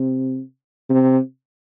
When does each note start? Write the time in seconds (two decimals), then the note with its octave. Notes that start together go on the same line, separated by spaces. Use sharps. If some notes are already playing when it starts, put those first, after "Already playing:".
Already playing: C3
0.90 C3